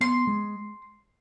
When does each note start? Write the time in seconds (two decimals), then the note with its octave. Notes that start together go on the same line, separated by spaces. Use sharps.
0.01 B3 C6
0.27 G#3